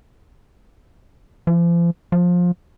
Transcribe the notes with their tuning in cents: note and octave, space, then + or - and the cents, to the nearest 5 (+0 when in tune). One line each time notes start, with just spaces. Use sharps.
F3 -40
F3 +20